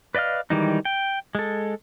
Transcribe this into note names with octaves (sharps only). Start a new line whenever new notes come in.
B4 D5 D#5 F5 F6
D#3 E3 G3 G#3 D#4
G5
G#3 A4